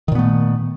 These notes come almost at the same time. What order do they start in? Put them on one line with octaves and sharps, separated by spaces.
D#3 A#2 B3 A3